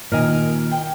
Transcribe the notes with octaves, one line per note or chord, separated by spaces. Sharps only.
A#2 D#3 A#4 D#5 G#5
G5